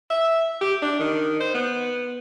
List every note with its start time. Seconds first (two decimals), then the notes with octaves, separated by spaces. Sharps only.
0.10 E5
0.61 G4
0.82 D4
1.00 D#3
1.40 C5
1.54 B3